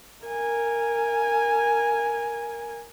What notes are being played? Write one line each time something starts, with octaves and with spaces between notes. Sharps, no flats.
A#4 G#5